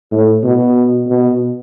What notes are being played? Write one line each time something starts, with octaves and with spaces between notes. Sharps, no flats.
A2
B2
B2